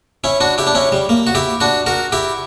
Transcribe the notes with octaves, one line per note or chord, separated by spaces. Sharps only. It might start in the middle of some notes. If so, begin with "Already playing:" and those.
C#4 E4
D4 F#4
E4 G4
D4
C#4 E4
G3
A#3
F#4
E4 G4
D4 F#4
F#4 A#4
E4 G4